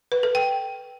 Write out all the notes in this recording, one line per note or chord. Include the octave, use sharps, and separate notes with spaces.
B4
A4
G5